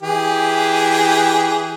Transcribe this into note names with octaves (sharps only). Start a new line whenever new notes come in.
E3 G4 G#4